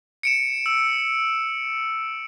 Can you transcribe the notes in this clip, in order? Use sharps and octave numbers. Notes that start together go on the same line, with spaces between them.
C#7 D7 E7
E6